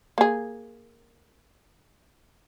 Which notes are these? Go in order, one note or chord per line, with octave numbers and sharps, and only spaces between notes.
A#3 G#4